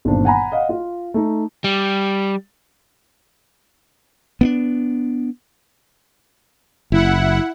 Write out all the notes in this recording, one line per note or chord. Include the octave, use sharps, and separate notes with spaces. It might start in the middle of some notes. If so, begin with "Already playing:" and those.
G1 A#2 D#3 C4 D4
F#5 G#5 A#5 B5
D#5 F5 F#5
F4
A3 D#4
G3
B3 C#4 D4
F#1 E4 F#5